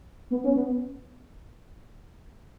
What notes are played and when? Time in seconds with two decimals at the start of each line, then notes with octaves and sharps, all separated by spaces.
0.31 B3
0.44 C#4
0.56 B3